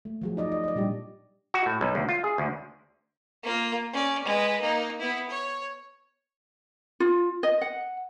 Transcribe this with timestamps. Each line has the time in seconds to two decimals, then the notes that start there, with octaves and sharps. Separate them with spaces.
0.05 A3
0.21 F3 F#3 G#4
0.37 D#4 D5 D#5
0.52 D#5
0.64 D5 D#5
0.76 A#2 G3 D4 G4
1.54 F#4
1.66 A2
1.81 B1
1.95 D2
2.09 F4
2.24 G#4
2.38 D2
3.43 A#3 F4
3.93 C#4 D5
4.24 G#3 B4
4.61 A#3 D#4
5.00 B3 E4
5.29 C#5
7.00 F4
7.43 D#5
7.61 F#5